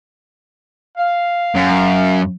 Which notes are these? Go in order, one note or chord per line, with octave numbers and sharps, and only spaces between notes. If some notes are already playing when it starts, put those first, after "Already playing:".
F5
F#2